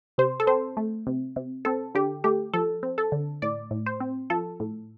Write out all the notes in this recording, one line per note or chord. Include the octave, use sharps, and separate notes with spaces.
C3 C5
A4
C4 C5
A3
C3
C3
C4 A4
D3 G4
A3 G4
F3 A4
C4
A4
D3
A2 D5
A2
C5
C4
F3 A4
A2